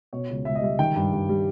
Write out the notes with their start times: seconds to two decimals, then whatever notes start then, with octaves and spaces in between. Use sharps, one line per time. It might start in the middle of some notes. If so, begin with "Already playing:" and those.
0.13 B2 C#5
0.29 C#2
0.45 C#2 E5
0.55 D#5
0.62 G3 E5
0.79 D#3 G5
0.96 G2
1.13 G2
1.29 G3